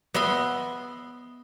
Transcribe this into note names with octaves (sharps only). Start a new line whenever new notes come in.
B3 D#5 E5 B5 C6